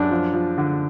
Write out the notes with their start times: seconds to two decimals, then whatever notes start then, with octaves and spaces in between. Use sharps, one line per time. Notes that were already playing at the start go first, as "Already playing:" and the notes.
Already playing: F#2 D4
0.11 F3
0.34 F3
0.58 D3